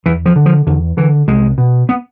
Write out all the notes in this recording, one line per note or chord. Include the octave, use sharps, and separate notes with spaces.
E2 E3
F3
D3
F3
E2 D3
D3 E3
C2 G#3
B2
B3